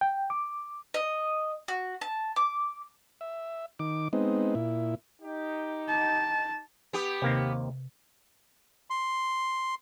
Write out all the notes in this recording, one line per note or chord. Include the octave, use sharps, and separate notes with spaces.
G5
D6
D#5
F#4
A5
D6
E5
D#3 D6
G#3 B3 C4 D#4
A#2 E4
D#4 G4
A5
B3 G4
D#2 C3 A#3 C4
C6